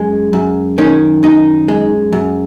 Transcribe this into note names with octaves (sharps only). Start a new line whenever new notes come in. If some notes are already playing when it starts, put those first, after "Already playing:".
Already playing: F#2 G#3
F#2
D#3 C#4
F#2 D#4
G#3
F#2